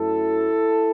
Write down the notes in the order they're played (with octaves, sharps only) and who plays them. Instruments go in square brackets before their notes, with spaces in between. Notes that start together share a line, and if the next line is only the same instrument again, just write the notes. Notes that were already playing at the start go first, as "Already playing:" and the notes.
Already playing: [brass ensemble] F#2 F#3 A3 E4 A4